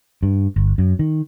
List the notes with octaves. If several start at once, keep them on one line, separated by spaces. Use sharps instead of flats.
G2
G1
F#2
D#3